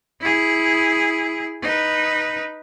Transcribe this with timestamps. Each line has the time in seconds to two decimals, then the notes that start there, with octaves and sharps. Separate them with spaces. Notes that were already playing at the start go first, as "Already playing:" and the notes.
0.21 E4 G#4
1.62 D#4 B4